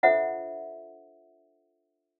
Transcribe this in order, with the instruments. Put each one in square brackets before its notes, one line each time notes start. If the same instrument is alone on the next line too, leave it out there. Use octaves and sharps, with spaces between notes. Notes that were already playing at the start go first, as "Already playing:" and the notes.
[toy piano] D4 F4 A4 C5 E5 F#5